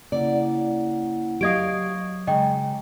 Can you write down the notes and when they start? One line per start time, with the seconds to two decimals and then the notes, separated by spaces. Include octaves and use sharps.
0.12 C#3 A#3 E4 D5 F#5
1.41 F#3 G4 D#5 F5 C#6 D#6 G#6 D7
2.27 C#3 G#3 D#5 G5 A#5 D6